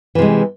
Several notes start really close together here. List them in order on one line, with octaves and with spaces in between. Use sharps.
E3 C3 G#3